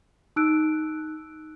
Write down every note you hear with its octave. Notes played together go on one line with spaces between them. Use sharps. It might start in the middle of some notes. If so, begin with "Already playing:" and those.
D#4 E6 F#6 D7